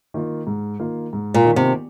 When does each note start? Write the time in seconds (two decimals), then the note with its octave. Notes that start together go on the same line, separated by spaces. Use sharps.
0.14 D#3 A#3 F4
0.47 G#2
0.80 D#3 A#3 F4
1.13 G#2
1.34 A#2
1.45 D#3 A#3 F4
1.56 C3